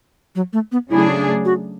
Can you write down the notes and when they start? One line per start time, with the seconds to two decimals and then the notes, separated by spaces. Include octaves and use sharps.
0.35 F#3
0.53 A3
0.72 B3
0.90 C#3 F#3 A3 D4 E4 G#4
1.45 F#4